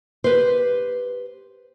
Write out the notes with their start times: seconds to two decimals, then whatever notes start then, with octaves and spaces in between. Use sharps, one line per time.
0.24 G4 B4 C5